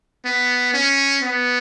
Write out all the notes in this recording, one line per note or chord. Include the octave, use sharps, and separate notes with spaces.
B3
C#4
B3